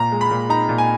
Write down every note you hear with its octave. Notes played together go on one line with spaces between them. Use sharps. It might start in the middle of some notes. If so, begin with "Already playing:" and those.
Already playing: A#2 A#5
G#3
B5
A#2
D#4 A#5
A#2
G#5